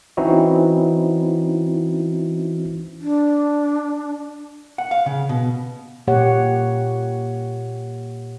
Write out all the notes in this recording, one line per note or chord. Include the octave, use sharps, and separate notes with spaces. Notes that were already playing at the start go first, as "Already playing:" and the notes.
E3 C4 C#4 D#4 E4 F#4
D4
F#5
F5
C#3
B2
A#2 A#3 G4 C#5 F#5